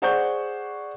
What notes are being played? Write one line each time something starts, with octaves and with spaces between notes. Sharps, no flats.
G#4 C5 D5 F#5 C#6 G6